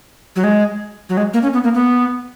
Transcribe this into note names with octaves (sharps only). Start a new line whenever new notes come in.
F#3
G#3
F#3
G#3
A#3
C#4
B3
A#3
B3